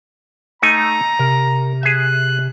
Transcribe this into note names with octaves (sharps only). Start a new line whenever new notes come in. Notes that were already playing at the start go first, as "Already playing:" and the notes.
A3 D#4 G#5 A#5
C3 A#4
G#4 E5 F#6